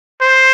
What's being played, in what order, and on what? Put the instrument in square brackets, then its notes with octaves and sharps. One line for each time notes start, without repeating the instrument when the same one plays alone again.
[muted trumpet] C5